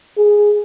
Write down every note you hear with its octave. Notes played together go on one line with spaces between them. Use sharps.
G#4